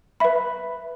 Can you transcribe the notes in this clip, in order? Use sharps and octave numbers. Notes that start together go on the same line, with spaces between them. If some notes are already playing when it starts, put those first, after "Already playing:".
B4 E5 B5